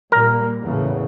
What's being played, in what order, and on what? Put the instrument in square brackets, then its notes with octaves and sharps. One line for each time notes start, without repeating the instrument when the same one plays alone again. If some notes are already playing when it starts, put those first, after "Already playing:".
[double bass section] A#2 G3 A#3 [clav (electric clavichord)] A#4
[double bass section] E2 A2 C#3